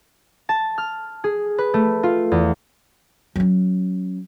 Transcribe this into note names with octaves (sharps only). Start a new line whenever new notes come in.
A5
F6
G#4
B4
A3
F4
E2
F#3 C#4